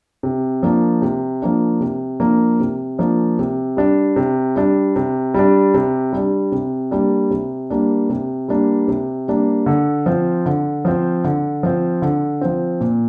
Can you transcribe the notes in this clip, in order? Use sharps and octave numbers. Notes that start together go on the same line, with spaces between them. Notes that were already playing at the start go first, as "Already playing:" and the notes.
C3
F3 A#3 D4
C3
F3 A#3 D4
C3
F3 A#3 D4
C3
F3 A#3 D4
C3
G3 D4
C3
G3 D4
C3
G3 D4
C3
G3 D4
C3
G3 A#3 D4
C3
G3 A#3 D4
C3
G3 A#3 D4
C3
G3 A#3 D4
D3
F3 C4
D3
F3 C4
D3
F3 C4
D3
F3 C4
A#2